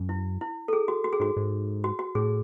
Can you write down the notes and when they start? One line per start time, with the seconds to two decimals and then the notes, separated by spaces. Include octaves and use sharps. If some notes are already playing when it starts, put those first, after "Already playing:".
Already playing: F#2
0.09 E4
0.41 E4
0.68 A4
0.73 G#4
0.88 F#4
1.04 F#4
1.13 G#4
1.20 G#2 F#4
1.37 G#2
1.84 F#4
1.99 F#4
2.15 A2 G#4